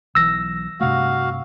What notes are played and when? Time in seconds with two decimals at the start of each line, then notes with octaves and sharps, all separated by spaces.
0.15 B1 E3 F#3 E6 A#6
0.81 G2 C3 A3 F#4 F5